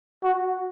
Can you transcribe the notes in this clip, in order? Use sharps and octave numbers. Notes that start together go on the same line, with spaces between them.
F#4